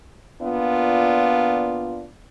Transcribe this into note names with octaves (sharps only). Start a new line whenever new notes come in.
A#2 B3 D4 F4